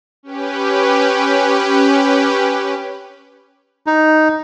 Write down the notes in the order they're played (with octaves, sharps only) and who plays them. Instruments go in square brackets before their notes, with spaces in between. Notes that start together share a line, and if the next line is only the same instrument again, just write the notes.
[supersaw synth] C#4 G4 B4
[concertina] D#4